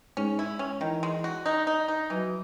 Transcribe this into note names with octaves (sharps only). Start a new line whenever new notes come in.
G#2 C#4
E4
C#4
D#3 E3
G#3
F#4
D#4
D#4
D#4
E3 F#3